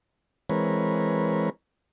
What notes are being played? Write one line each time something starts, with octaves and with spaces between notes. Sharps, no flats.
E3 G#3 C4 A#4 B4 C#5